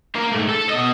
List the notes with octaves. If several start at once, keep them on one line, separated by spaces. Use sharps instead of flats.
A#3 A#4
G#2 A3
A4
B2 D#5